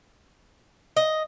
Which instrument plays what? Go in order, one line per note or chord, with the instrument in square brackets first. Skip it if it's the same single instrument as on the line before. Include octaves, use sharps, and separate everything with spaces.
[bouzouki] D#5